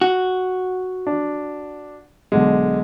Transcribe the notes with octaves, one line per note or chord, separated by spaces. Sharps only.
F#4
D4
B1 D3 G#3